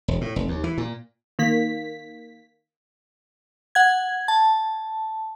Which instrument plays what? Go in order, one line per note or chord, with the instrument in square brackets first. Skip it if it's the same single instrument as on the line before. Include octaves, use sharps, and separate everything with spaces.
[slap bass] E1
A2
F1
D#2
E3
A#2
[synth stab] D#3 A#3 B6
[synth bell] F#5 G#6
A5